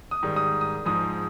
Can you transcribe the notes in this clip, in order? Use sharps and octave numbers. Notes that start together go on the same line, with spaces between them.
D#6
G#2 D#3 G3
D#6
D#6
G#2 F3 G#3 D#6